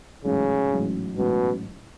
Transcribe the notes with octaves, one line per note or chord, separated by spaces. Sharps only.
A1 G#2 C#3 F#3 C#4
A1 G#2 F#3 C#4
A1 G#2 B2 F#3 C#4